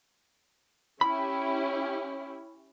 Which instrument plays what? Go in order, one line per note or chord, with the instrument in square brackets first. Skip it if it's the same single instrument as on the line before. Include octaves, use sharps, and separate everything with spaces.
[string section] C#4 E4 G4 [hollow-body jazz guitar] B5